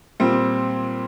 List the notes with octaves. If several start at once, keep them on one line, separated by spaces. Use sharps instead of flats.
A#2 G3 C4